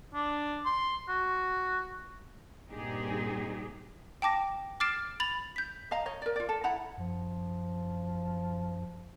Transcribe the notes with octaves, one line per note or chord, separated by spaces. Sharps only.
D4
C6
F#4
G2 A#2 C4 D#4 G4 G#4
G5 A5 D6 A#6
D6 F6 A6 C7 D7 E7
B5 A6 F7 F#7
G6 B6
D#5 F5 A#5
C#5 D#5
A#4 D5
F4 D5
A4
E4 F#5 A#5 B5
F#2 F3